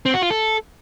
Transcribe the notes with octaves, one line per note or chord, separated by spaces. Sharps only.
C4
F#4
F4
A4